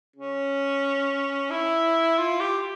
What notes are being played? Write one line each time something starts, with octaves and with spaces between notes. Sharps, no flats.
C#4
E4
F4
G4